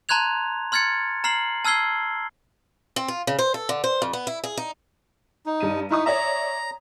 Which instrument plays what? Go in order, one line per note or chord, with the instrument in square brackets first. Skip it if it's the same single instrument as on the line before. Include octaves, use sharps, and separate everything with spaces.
[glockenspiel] A5 A#5 C6 F#6 G#6 F7
C6 F6 G#6 A6 C#7
A#5 F6 C7 F#7
A5 E6 F6 G#6 C7 G7
[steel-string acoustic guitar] C4
F4
C#3
C5
A4
D3
C5
F2
B3
E4
G#4
D#4
[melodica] D#4
[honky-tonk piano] G2 D#7
[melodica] D#4 [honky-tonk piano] E4 C#6 D#6
[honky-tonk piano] C#5 D5 E5 [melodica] A#5